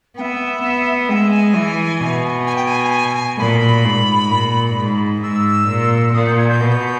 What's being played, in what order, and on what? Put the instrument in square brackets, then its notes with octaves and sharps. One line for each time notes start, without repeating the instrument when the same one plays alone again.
[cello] B3 [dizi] E5 G5
[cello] B3
[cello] G#3 [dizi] G5
[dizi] E5
G#5
[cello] E3
B2
[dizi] G#5
G5
G#5
[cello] A#2 [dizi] B5
[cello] G#2
A#2
G#2
[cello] G#2 [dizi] E6
[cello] A#2
[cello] A#2 [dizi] D#6
[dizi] G6
G#6
G6
[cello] B2